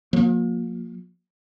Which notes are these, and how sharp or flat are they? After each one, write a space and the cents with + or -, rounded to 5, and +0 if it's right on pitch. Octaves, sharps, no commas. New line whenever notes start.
F3 +40 A#3 +0